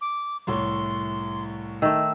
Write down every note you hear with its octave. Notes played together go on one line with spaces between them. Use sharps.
D6
C2 A2 C#5 C6
D#3 A3 E6